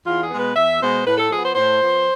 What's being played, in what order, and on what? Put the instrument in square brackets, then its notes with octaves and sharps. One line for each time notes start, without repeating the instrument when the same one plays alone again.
[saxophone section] E2 F4
G#4
B2 G#3 B3
B4
E2 E5
B2 G#3 B3 C5
A2 B4
A4
F3 B3 G#4
C5
A2 C5
F3 B3